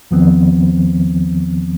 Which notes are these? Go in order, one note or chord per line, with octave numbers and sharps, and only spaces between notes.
E2 D#3 F3 B3 C4